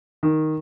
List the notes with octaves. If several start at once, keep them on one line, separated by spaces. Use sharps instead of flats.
D#3